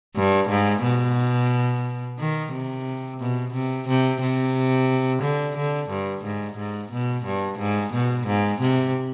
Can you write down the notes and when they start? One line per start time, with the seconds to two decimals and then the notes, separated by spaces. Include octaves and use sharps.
0.16 G2
0.49 G#2
0.83 B2
2.19 D#3
2.53 C3
3.21 B2
3.54 C3
3.88 C3
4.21 C3
5.22 D3
5.57 D3
5.90 G2
6.24 G#2
6.58 G#2
6.92 B2
7.25 G2
7.59 G#2
7.93 B2
8.27 G#2
8.61 C3